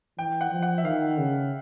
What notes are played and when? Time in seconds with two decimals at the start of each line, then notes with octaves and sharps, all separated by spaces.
0.18 E3 G5
0.41 F#5
0.51 F3
0.63 F#5
0.78 E5
0.84 D#3 F5
1.18 C#3